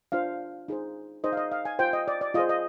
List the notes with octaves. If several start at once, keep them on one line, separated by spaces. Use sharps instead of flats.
D4 F4 C5 F5
D#4 G#4 C5
D#4 G#4 C5 D#5
F5
D#5
F5
G#5
F4 C5 G5
D#5
D5
D5
F4 G#4 C5 D#5
D#5